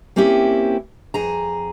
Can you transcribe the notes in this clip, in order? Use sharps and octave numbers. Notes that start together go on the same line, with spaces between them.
A#3 C4 C#4 E4 G4
F2 G#4 A#5